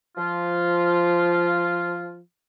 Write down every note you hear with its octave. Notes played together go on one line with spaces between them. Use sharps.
F3 F4